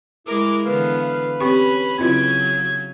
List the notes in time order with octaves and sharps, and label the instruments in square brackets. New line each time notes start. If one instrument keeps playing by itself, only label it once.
[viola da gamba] G#3 A#4 [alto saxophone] E4 [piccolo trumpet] D6
[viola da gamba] D3 E3 B3 [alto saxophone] B4 [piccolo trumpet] F5
[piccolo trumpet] F5
[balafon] C4 G4 C#6 [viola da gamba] C#4 [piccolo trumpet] B5
[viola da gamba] C#3 F#3 C#4 [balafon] C4 E4 F4 [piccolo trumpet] G#6